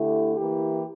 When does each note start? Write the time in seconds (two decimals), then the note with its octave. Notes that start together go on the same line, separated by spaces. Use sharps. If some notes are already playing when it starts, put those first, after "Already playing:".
Already playing: D3 A3 E4 G4
0.35 E3 A#3 E4 G4